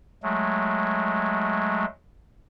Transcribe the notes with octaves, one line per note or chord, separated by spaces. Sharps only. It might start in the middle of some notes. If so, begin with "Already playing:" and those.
F#3 G#3 A3